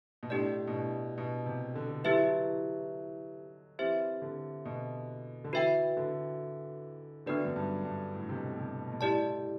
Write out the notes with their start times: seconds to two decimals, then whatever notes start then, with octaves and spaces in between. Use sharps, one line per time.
0.23 B2
0.30 A2 D4 G4 D5
0.67 B2
0.74 A2
1.18 B2
1.46 C3
1.75 D3
2.04 F#3 E4 G4 B4 E5
3.79 E3 C4 G4 C5 E5
4.22 D3
4.65 B2
5.44 D3
5.53 E3 F#4 B4 E5 G5
5.97 D3
7.26 D3 B3 D4 F#4 B4 D5
7.45 F#2
7.56 G2
7.85 G2
8.14 A2
8.29 C3
8.36 B2
8.57 C3
8.79 B2
8.92 B2
9.01 A2 E4 G4 D5 A5